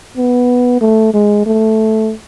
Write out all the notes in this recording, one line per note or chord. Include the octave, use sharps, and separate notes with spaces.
B3
A3
G#3
A3